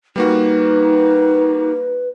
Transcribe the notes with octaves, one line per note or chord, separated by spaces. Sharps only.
G3 A#3 D#4 F#4 B4